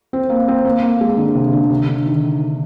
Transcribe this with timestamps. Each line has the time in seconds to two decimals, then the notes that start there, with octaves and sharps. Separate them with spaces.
0.13 C4
0.30 A#3
0.48 C4
0.65 A#3
0.83 A#3
1.01 G#3
1.17 D3
1.35 C3
1.53 D3
1.70 C3
1.88 D3
2.06 D#3